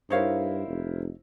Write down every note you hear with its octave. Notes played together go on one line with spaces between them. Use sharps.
G2 D#4 E4 A#4 C5 C#5 F5
F1